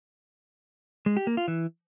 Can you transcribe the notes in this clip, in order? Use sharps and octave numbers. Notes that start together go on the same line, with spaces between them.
G#3
G4
A#3
F4
E3